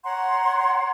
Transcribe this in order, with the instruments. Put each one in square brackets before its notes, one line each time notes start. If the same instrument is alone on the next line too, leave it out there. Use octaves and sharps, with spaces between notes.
[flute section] C#5 F#5 A#5 C6